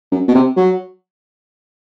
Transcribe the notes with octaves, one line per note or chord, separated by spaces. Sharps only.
F#2
B2
C3
F#3